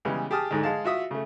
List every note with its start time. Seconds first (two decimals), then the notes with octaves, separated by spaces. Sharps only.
0.05 C#3 E3 G3 G#3 B3
0.31 G4 G#4 A5 D#6 F6
0.51 D2 G#2 D3 G#3
0.64 G#3 F5 A5
0.84 F4 F#4 E5 D#6 E6
1.11 C#3 A3